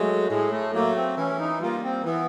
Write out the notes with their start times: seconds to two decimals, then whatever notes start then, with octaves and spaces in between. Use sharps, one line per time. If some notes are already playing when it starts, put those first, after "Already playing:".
Already playing: F#3 G#3 A3
0.30 A2 G#3
0.52 A3
0.74 F#3 A3 A#3
0.96 C4
1.17 E3 C#4
1.39 D#4
1.61 G3 A#3 F4
1.83 C4
2.04 E3 B3